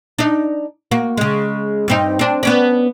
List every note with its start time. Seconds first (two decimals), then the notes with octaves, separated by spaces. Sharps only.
0.18 D4 D#4
0.91 A#3 F#4
1.17 C#3 G#3
1.88 G2 C4 D#4
2.19 C4 D4
2.43 B3 C#4 D4